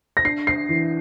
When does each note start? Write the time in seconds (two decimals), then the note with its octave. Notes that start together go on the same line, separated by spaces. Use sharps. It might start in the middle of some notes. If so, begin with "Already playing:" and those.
0.17 A#6
0.25 D4 C7
0.47 C7
0.69 E3